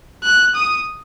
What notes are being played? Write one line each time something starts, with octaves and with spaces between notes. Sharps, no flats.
F#6
D#6